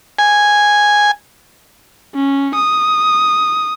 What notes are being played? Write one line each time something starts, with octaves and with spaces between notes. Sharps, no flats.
G#5
C#4
D#6